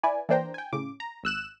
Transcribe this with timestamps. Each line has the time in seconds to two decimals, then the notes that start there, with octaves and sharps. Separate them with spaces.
0.03 E4 B4 D5 G#5
0.29 E3 A#3 D4 C5 G5 A#5
0.54 G5 G#5
0.73 A2 C#3 D6
1.00 A#5
1.23 G#1 E6 F#6 E7